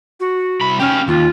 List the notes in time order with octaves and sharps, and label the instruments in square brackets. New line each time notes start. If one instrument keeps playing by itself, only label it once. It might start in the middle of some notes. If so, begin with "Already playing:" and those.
[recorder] F#4
[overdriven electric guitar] C2 B5
[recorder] C#4 [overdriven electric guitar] G4 F5
[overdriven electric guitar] D#2 [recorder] F4